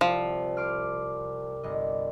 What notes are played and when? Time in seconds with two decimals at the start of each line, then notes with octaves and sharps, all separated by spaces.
0.01 C2 F3
0.57 C6 D6 F6
1.63 G1 D#5